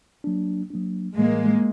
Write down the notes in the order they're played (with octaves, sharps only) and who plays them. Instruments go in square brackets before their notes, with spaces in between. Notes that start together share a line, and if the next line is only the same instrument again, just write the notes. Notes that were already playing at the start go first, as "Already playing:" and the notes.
[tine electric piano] F#3 A#3 D4
F#3 A#3 D4
[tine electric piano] A2 E3 G3 [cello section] G#3 A#3